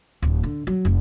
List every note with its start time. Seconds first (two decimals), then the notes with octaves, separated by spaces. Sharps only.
0.22 D1
0.43 D3
0.67 F#3
0.85 F1